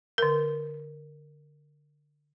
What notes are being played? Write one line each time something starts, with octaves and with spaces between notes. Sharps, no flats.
D3 A#4